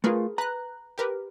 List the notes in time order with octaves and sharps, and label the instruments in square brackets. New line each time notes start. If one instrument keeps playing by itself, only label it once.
[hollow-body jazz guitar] A3 F4 [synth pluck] G#4 A#4 B4
[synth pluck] B4 F#6 [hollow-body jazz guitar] A#5
[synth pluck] G4 A#4 B4